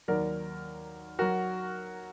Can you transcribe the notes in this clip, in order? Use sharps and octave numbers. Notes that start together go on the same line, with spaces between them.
D#2 D#3 F#3 A#4 D5
F#3 F#4 A#4